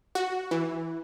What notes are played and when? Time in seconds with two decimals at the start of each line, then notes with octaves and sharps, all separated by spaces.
0.15 F#4
0.51 E3